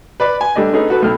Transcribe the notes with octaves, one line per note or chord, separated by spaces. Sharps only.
B4 D5 B5
G#5
G3 A3 D4 D#5
A3 C#4 D#4 G#4 B4 C#5
F#4 A4 B4
B1 A3 G5 F6